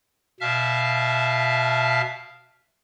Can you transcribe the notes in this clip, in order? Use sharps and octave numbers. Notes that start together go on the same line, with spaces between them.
B2 E5 F5 A5 F6